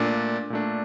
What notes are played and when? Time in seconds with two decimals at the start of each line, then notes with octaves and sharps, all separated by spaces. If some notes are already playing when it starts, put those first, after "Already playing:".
Already playing: A#2 A3 D4
0.50 A#2 A3 D4